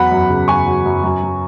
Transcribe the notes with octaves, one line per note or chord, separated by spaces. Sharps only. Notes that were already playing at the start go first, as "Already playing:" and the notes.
Already playing: E2 F#3 F#5 B5
F#2
C#3
F#2 G#5 C#6
F#3
F#2
F#2
F#3